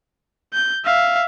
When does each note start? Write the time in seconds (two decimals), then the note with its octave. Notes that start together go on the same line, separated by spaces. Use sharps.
0.54 G6
0.85 E5 F5